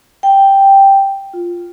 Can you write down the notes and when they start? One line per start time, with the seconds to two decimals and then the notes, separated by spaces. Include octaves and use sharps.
0.23 G5
1.34 F4